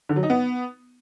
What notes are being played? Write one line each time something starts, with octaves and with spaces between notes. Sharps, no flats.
D3
F#3
D#4
B3